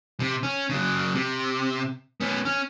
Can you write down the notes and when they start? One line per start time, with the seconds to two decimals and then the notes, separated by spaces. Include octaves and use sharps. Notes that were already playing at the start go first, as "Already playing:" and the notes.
0.20 C3
0.43 C#4
0.70 C#3 F#3
1.14 C3
2.20 B3 C#4
2.45 C#4